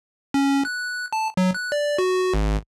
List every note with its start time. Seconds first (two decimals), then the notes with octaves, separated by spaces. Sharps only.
0.34 C#4
0.65 F#6
1.13 A5
1.37 F#3
1.54 F#6
1.72 D5
1.98 F#4
2.34 G#1